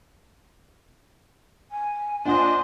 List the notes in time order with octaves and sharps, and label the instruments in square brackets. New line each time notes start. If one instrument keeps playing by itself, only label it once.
[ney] G#5
[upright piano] A#2 F#5 [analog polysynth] D4 D#5 [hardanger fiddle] C5